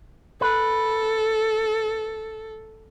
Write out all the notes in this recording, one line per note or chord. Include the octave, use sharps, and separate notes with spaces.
A4 B4